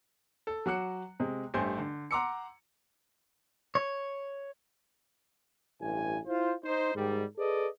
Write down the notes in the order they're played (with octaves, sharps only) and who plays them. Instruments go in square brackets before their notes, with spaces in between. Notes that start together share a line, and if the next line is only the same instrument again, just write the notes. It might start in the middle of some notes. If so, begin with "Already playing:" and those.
[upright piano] A4
F#3 F#4 D6 F#6 C#7
C3 G#3
A1 G2 A3 C5 G#5 G6
D3
F#5 A#5 C6 D6 E6 C#7
[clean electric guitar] C#5
[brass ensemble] A1 G2 E4 G#5
E4 F4 C5
D#4 C5
G#2 D#3 G3
G#4 A4 B4 D5 D#5